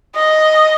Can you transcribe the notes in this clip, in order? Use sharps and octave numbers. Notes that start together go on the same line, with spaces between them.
D#5